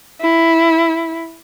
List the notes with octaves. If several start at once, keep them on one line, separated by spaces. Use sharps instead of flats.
E4